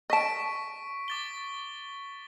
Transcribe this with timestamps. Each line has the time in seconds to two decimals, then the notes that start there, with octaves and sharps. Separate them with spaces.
0.10 D#5 A5 C#6 B6 D7
1.08 D6 A6 G7